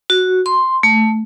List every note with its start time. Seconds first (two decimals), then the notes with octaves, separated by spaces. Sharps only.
0.10 F#4
0.46 C6
0.83 A3